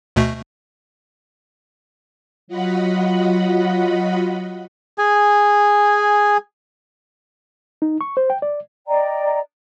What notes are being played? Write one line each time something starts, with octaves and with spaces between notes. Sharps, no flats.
D2 B2 A3
F#3 F4 F#4 D#5 F#5 B5
G#4 G#5
D#4
C#6
C5
G5
D5
D5 D#5 G5 A#5